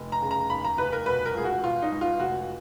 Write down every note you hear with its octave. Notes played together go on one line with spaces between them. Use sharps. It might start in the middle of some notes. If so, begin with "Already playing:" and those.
Already playing: F1
A#5
C#3
A#5
D#2 B5
A#5
F1 B4
A#4
B2 B4
A#4
C#2 G#4
F#4
B2 F4
D#4
C#2
F4
F1 F#4